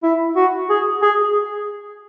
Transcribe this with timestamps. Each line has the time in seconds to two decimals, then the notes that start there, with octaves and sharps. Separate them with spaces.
0.03 E4
0.36 F#4
0.70 G#4
1.02 G#4